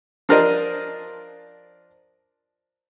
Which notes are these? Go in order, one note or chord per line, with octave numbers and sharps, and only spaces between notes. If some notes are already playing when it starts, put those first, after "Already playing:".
F3 D4 A#4 C5 D5 D#5